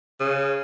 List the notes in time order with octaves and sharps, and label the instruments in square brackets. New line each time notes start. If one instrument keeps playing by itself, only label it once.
[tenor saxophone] C#3